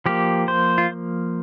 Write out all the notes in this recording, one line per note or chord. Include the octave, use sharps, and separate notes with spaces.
F3 A#3 G4
C5
F4